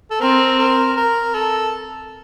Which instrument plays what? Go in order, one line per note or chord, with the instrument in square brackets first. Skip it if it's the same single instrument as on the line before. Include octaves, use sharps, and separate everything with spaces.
[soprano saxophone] A4
[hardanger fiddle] C4 [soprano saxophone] A#4
[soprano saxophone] A#4
A#4
A4